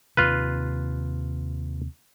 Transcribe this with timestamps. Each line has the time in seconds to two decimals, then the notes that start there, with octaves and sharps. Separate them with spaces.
0.17 D#2 C3 F4 B4